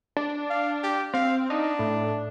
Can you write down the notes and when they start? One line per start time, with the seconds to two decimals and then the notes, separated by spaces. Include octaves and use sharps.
0.17 D4
0.50 F5
0.83 G4
1.14 C4 F5
1.50 D4 D#4
1.79 A2